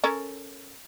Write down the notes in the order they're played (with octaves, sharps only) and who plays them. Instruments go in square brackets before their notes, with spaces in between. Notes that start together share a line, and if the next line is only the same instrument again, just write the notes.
[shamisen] C#4 A4 A#4